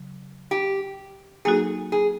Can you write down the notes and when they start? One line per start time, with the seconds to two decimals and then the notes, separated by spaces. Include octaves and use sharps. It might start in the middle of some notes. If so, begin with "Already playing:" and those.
Already playing: C#3 F#3
0.51 G4
1.45 F#3 A#3 D#4 F#4 G#4 A4
1.92 G#4